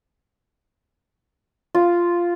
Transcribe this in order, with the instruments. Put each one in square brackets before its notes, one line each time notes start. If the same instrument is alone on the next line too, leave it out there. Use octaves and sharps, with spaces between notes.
[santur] F4